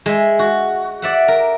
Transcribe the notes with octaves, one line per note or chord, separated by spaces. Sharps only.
G#3 E5
F#4
D5 E5 F#5
A#4